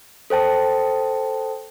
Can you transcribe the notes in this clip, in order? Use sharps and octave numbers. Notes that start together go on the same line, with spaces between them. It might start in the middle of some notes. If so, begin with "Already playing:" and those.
A4 C5 G5 A5